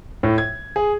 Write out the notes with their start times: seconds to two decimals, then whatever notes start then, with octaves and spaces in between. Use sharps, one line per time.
0.23 A2
0.38 G#6
0.76 G#4